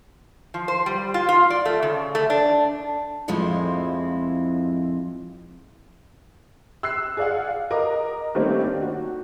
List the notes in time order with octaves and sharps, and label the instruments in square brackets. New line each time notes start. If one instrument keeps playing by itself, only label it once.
[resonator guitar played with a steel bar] F3
C5
G3
F4
F4
D5
A3
C#3
A3
D4
[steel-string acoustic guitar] F2 A2 F3 G#3 C4 E4
[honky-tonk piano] E6 F#6 C7
G#4 D5 F5 F#5
A#4 D#5 A#5 D6
D#3 G3 A3 A#3 C4 C#4
D4
F#4